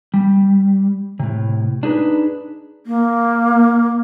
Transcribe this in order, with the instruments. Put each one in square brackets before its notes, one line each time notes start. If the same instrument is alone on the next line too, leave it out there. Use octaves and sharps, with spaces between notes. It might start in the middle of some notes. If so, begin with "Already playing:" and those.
[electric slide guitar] G3
A2 C3
D4 D#4 G#4 B4
[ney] A#3